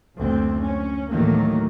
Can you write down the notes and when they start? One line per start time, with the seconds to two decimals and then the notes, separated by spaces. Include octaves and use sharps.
0.15 F#1 D2 C4
0.62 C#4
1.10 E2 A2 D#3 F#3 A3 A#3